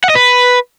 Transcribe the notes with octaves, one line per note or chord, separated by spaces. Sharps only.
F#5
D#5
B4